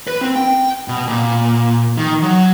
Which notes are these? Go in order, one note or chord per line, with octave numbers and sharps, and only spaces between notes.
B4
C4
G5
B2
A#2
D#3
F#3